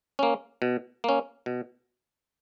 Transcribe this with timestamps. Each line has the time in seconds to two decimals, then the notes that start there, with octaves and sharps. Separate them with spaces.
0.19 A#3 C#4
0.62 B2
1.04 A#3 C#4
1.46 B2